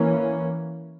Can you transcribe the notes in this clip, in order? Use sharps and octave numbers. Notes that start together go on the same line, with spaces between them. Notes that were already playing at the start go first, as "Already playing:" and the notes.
Already playing: E3 A#3 C#4